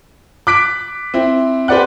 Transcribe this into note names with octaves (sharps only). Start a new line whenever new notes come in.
D6 F#6 B6 D7
C4 E4
G4 B4 C5 D5 F#5 F#6